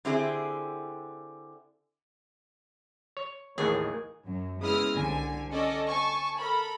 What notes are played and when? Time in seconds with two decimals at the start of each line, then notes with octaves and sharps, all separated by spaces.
0.05 D3 C4 E4 G4 G#4
3.17 C#5
3.58 A1 D#2 A2 A#3 D#4 G#4 A#4
4.25 F#2
4.59 C#3 G#3 B3 E4 D#6 F6
4.94 C2 D3 G#5
5.52 C#4 A4 D5 D#5
5.87 G#5 A5 C#6
6.39 A4 A#4 B5